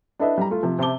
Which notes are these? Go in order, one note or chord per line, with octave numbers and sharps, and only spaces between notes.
D4 E4 A4 B4 D#5 E5
G3 A#5
A3 F4
C3 F3
C3 C5 E5 A5 D6 G7